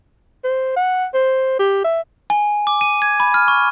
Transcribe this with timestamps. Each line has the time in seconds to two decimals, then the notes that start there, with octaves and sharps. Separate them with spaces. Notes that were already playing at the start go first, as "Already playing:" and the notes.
0.44 C5
0.76 F#5
1.14 C5
1.59 G4
1.84 E5
2.30 G#5
2.67 D6
2.81 D#7
3.02 G#6
3.20 B5
3.34 F6
3.48 C#6